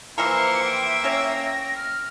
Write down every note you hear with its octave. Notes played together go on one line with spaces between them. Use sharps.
E3 F3 A#3 A#4 C5 E5 C6 C#7
G5 D7
C#4 C#5 A#6
F6